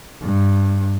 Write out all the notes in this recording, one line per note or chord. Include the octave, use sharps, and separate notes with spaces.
G2